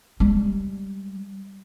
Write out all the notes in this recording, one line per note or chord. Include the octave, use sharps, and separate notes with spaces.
G3 G#3